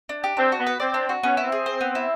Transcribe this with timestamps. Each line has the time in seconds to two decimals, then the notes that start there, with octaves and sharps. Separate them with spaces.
0.09 D4
0.24 G4
0.37 C4 D4
0.52 F#4
0.59 B3
0.67 B4
0.80 C4 D5
0.94 D4
1.09 F#4
1.23 B3 C#4
1.37 E4
1.44 C4
1.52 G#4
1.66 C5
1.81 B3
1.95 E4